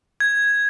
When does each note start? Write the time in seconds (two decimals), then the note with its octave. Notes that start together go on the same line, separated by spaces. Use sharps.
0.20 G#6